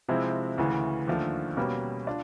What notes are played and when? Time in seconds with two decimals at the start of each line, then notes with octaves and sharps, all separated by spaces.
0.09 C3 F3 G#3 C4 E4
0.58 D2 C#3 E3
1.07 D#2 D3 F3 A3
1.57 B2 G3 A#3 C#4
2.07 D4 F4